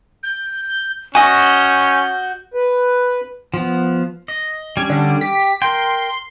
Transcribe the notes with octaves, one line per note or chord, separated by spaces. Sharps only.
G6
C#4 F#4 D#5 G#5 G6
B4
F3 B3
D#5
G3 C#4 D4 G#6
D3
G4 B6
A#4 G5 C6